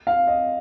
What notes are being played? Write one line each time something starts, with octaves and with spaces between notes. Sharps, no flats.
F5
D#5